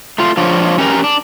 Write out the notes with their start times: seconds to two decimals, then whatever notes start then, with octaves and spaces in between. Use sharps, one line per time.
0.18 A3 F4
0.37 F3 D4 F4 C#5
0.78 C#4 G4 A#4 F5 A#5
1.04 D4